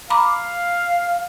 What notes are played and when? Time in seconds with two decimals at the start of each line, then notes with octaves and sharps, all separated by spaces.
0.10 F5 A#5 B5 D6